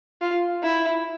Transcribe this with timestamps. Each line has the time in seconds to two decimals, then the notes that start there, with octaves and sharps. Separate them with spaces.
0.21 F4
0.63 E4